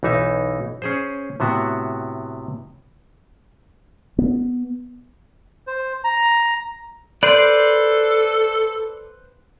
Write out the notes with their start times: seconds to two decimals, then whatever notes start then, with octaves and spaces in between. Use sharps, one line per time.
0.03 B1 E3 D#4 E5
0.82 C#4 G#4 C5
1.40 A2 C3 B3 F#4
4.19 B3
5.67 C5
6.04 A#5
7.23 A4 B4 C5 D5